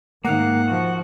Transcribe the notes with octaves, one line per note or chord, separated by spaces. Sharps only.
G#2 D#3 A#3 F5 F#5
F3 F#4